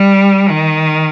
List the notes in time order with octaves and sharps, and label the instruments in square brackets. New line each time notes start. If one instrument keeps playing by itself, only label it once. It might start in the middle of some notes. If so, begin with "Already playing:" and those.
Already playing: [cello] G3
D#3